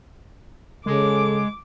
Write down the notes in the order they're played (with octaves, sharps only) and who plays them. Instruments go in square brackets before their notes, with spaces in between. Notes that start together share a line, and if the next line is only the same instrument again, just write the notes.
[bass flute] C#3 [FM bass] G#3 [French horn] A4 [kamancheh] D6